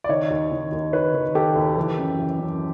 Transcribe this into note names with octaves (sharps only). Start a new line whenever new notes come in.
D5
D#3 C#5 D#5
D#2
D#3
D#2
D#3 B4 C#5
D#3
D#3 G4 A4
D#2
E3
F#2
E3
F#2